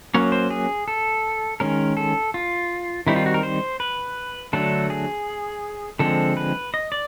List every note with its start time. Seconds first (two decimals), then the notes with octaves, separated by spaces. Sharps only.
0.14 F#3 A#3 C#4 C#5
0.32 C5
0.50 G#4
0.88 A4
1.60 D#3 G#3 C#4 A#4
1.97 A4
2.34 F4
3.07 D#3 G3 C4 D#4 E4
3.16 F4
3.26 F#4
3.34 A#4
3.43 C5
3.80 B4
4.53 D3 F#3 A3 D4 A4
4.90 G#4
5.99 D3 F3 G#3 C4 A4
6.37 B4
6.74 D#5
6.92 D5